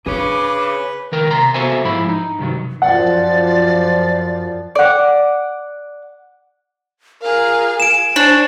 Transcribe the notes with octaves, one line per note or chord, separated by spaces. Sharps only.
D4 G#4 B4 C#5 D6
C#2 D#3 A#4 G5
C3 A#5 C6
B3 F#4 A4 C5 E5 G#5
G#2 F3 E4 B5
D#4
G2 C3 D#3 F#3
F#2 F3 D5 F#5
D5 F#5
F4 G#4 A#4 F5
G#5 D7 E7
D4 C5 C#5